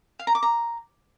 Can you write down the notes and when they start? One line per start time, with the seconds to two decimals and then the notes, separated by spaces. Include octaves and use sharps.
0.19 F5
0.27 A#5
0.35 D6
0.43 A#5